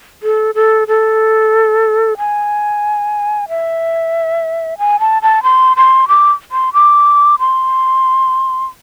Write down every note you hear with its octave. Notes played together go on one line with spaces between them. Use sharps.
A4
A4
A4
G#5
E5
G#5
A5
A5
C6
C6
D6
C6
D6
C6